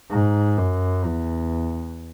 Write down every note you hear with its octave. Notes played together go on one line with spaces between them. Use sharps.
G#2
F#2
E2